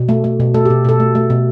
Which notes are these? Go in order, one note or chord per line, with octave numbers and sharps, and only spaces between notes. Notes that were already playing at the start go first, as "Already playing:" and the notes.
Already playing: B2
A3
A3
B2
A3 A4
G4
B2
B2 A4
A3
A3
B2